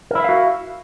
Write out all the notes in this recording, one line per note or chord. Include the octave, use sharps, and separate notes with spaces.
E4 F#4 A#4 E5 F5